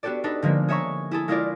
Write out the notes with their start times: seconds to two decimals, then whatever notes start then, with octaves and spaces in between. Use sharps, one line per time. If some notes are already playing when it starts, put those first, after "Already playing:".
0.03 B3 D4 F#4 G4 A4 D5
0.24 D4 D#4 A4 B4
0.42 D3 F3 G#3 A#3
0.68 G#4 C#5 E5 A#5 C#6
1.11 E4 G#4 A4
1.28 G#3 A#3 E4 F4 A#4 D5